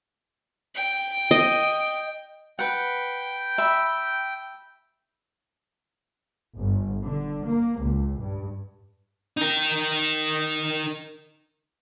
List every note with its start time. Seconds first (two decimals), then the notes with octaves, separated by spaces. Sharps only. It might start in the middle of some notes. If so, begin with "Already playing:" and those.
0.76 G5
1.31 D#5
2.59 B4 F#5 G5
3.58 E5 B5
6.57 G1
7.05 D3
7.47 A#3
7.80 C#2
8.19 G2
9.37 D#4 A#4